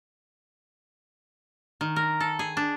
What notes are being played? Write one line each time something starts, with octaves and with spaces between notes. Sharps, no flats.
D#3
A#4
A4
G#4
D4